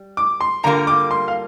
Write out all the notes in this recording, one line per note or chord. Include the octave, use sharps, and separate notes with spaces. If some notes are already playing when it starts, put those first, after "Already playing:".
Already playing: G3
D6
C6
G2 D3 G3 A#3 F4 A#5
D6
C6
F5